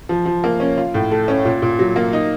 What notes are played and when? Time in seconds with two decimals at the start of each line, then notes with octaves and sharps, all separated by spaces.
0.09 F3
0.26 F3
0.44 A#3
0.60 C#4
0.78 F4
0.94 A2
1.11 A3
1.28 C#4
1.45 A#2
1.62 A#2
1.79 F#3
1.96 A#3
2.13 D#4